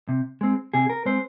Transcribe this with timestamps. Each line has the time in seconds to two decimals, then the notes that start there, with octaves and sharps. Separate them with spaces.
0.09 C3
0.41 G#3 C4
0.74 C3 G#4
0.90 A#4
1.05 G#3 C4 C5